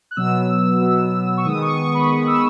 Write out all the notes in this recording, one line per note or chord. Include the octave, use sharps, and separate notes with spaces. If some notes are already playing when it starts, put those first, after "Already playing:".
F#6
B2 F#3 B3 E6
B2 F#3 B3
C#6
D#3 G#3 B3 D#6
C#6
C#6
B5
D#3 G#3 B3
E6